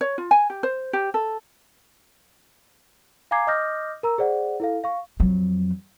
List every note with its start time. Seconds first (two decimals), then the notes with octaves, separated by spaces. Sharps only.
0.01 C#5
0.18 F4
0.31 G#5
0.50 G4
0.63 C5
0.93 G4
1.14 A4
3.31 F5 G#5 A#5 D6 G#6 C7
3.47 D#5 D6 D#6 F6 G6 A#6
4.03 A#4 A#5 E6
4.18 G#4 C5 D5 F#5
4.60 E4 A4 F5
4.84 F5 C#6
5.20 F2 F#3